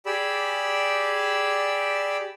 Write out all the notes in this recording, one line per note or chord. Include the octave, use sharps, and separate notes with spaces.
G4 G#4 D5 B5 E6